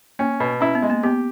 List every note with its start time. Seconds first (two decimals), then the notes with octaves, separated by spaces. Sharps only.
0.19 A#3 C#4
0.40 B2
0.61 C#4 E4
0.75 B3
0.82 G#3
0.90 A#3
1.03 B3 G4